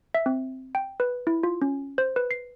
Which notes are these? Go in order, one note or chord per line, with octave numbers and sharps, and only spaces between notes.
E5
C4
G5
B4
E4
F4
C#4
C5
B4
C7